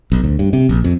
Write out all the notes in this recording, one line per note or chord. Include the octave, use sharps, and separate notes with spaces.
B1
D2
G2
C3
A#1
F2